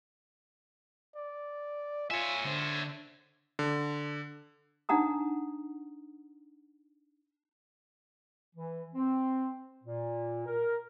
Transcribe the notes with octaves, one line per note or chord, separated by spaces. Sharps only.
D5
F4 C#5 E5 G#5
D3 C5
D3
D4 D#4 F#5 A#5 D#6
E3
C4
A#2
A#4